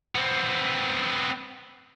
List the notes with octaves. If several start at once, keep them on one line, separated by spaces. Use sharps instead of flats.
B3 C4